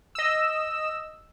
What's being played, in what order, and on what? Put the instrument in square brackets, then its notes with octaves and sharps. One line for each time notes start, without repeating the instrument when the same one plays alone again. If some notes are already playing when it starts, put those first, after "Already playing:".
[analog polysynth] D#5 E6